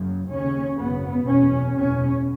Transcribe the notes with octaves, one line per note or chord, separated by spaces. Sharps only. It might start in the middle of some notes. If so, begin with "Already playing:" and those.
Already playing: F#1 F#2 C#3
D#2 C#3 C#4
G#1 F#2 C#3 B3
F#1 E2 B2 C#4
F#1 E2 B2 C#4